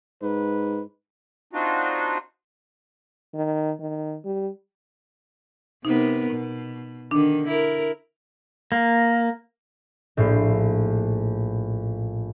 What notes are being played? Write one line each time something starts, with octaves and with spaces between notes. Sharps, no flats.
G#2 B4
C4 D4 D#4 F4 F#4
D#3
D#3
G3
C3 B3 D#4 A#4
B2
D3 D#3 D4
E4 A#4
A#3
A#1 A2 C7